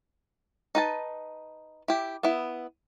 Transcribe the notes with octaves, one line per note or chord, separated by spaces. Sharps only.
D#4 B4 A5
E4 G4
B3 E4